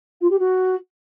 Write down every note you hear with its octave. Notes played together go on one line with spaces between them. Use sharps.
F4
G4
F#4